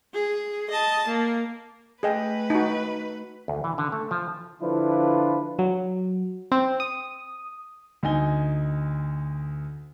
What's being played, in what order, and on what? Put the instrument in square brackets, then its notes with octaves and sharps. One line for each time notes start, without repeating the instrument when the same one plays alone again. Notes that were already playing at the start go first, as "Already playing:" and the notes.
[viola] G#4
D#5 A5
A#3
[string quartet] A3 B4 [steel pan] G#4 D#5 G5
[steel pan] D#4 F#4
[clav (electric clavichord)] D2
E3
D3
A3
F3
[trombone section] D3 F3 D4 E4 F4 B4
[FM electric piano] F#3
C4
D#6
[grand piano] D2 D#4 G#5 G7